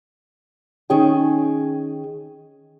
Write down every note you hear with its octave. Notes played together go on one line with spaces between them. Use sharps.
D#3 C#4 G#4 G5